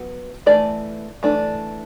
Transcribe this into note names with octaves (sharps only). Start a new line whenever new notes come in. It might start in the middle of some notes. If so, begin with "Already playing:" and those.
Already playing: F#3 B3
E3 A3 D5
E3 A3 D4